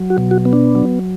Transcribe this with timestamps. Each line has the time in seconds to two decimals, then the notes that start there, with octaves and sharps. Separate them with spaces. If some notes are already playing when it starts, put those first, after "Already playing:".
Already playing: F#3
0.10 F#4
0.18 B2
0.31 F#4
0.45 B3
0.53 D4
0.75 F#3